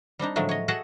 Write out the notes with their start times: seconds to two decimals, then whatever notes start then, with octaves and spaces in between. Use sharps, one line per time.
0.19 G3 C4 D4 D#4
0.36 A2 D3 F3 F#3 G#3 A3
0.49 C#5 D#5
0.68 F#4 G#4 A4 D#5 E5 F#5